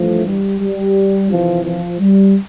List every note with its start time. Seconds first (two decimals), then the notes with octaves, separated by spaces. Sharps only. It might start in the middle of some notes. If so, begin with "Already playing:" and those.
Already playing: G2 E3 F3 A3
0.25 G3
0.60 G3
1.30 F2 C3 E3 F3
1.64 F3
1.99 G3